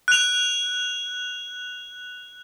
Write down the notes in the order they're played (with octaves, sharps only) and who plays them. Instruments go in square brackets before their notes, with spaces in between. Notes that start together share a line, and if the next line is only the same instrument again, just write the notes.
[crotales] F#6 F7